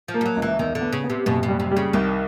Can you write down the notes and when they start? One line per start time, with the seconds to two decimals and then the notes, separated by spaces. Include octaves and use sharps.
0.08 F3
0.14 A#3
0.21 G3
0.26 F#3
0.36 C#2
0.42 E3
0.59 E2 D#3
0.75 D3
0.81 B3
0.93 C#3
1.04 B3
1.10 C3
1.26 F#1 B2
1.43 B2
1.48 G3
1.60 C3
1.71 G3
1.77 C#3
1.93 C2 D#3